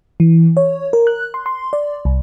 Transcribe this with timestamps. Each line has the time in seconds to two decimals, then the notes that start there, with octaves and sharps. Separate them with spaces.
0.20 E3
0.57 C#5
0.93 A#4
1.07 F#6
1.34 C6
1.46 C6
1.73 D5
2.05 C2